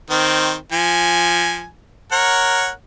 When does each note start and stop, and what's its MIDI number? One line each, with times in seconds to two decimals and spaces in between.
0.10 0.55 51
0.10 0.55 60
0.72 1.66 53
0.72 1.66 80
2.12 2.70 70
2.12 2.70 73
2.12 2.70 78